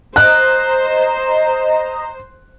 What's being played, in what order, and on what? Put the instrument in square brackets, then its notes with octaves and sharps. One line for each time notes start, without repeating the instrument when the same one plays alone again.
[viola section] C5 [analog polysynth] D#5 A#5 [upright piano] F#6